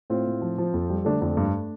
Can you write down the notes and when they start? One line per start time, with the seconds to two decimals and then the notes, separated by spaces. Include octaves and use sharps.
0.10 A2 C4 F4
0.26 A2
0.42 F3
0.58 F3
0.74 F2
0.90 G3
1.05 D3 A3 D4
1.21 F2 A3 D4
1.37 G2